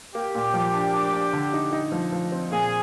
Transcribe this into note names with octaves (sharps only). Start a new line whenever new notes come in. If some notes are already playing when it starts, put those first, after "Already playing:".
A#3 G4
A#2
F3
D4
D4
D4
D3
D#4
D#4
F3
F3
C4
A#2 G#4